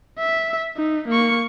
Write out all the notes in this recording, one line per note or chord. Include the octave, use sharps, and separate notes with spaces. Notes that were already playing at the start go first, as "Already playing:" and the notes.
E5
D#4
A#3 C#6